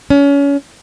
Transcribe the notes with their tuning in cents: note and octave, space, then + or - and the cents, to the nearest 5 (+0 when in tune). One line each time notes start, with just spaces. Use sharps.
C#4 +30